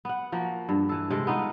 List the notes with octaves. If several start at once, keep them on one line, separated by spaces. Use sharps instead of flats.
B3 F#5
F3 A#3 F#4
G2
E3 A4
C3 G#3 A4
B3 D#4 F4